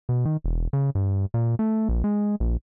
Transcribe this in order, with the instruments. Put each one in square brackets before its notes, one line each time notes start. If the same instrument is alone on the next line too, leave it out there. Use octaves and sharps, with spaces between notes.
[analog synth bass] B2
D#3
E1
C#3
G2
A#2
A3
A#1
G#3
A#1